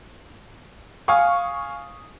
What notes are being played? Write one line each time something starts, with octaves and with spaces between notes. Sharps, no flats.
F5 G#5 C#6 D#6